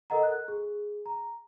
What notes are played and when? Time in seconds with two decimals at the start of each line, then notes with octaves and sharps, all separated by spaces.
0.10 A4 A#4 D#5 F#5 A#5
0.23 F#6
0.48 G#4
1.06 A#5